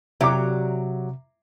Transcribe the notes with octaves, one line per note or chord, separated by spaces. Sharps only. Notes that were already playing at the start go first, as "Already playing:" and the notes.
C3 F#3 G4 D5 E5 A#5 D6